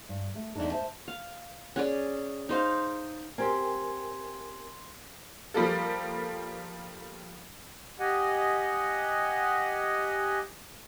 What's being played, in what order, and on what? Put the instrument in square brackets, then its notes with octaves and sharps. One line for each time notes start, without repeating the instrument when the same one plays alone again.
[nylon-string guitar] G2
A3
E2 G2 D4 D#4 A4
C5 E5 A5
[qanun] F5
C#4 G#4 D5
D#4 C5 F5
[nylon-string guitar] C4 G4 [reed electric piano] A#4 G#5 [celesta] C6 G#6
[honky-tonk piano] F3 G3 A#3 A4
[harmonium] G4 D#5 F#5 G#5